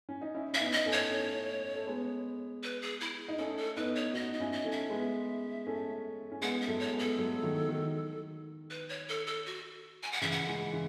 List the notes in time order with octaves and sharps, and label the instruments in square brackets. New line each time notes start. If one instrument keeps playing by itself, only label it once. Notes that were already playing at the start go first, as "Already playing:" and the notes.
[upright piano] C#4
D#4
C#4 E4
[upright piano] C#4 [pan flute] E5
[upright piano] B3 D#4
[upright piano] B3 [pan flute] D#5
[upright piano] A3 C#4
[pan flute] C#5
[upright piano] A3 C#4
A3
G#3 B3
[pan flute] B4
G#4
E4
[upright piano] D#4
[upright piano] A3 C#4 [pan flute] A4
[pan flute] A4
[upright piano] B3 D#4 [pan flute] B4
[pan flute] C#5
[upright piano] D#4 F#4 [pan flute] D#5
[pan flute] D#5
[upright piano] C#4 E4
[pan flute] D#5
[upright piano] A3 C#4
[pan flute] E5
[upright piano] G#3 B3
A3 C#4
C#4
[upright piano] G#3 B3 [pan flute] F#5
[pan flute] E5
[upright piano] F#3 A3
[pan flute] C#5
[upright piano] G#3 B3
[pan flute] A4
[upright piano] F#3 A3
D#3 F#3
D#3
[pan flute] B4
C#5
A4
A4
F#4
G#5
F#5
[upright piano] C#3 E3 [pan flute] E5
[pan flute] F#5
[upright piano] E3 G#3
C#3 E3